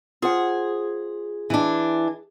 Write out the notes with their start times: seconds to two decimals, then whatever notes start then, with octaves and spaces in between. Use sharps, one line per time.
0.22 F4 G#4 C5 F#5
1.50 E3 D4